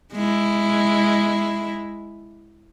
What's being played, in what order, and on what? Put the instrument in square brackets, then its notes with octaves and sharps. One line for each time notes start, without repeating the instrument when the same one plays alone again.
[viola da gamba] G#3 E4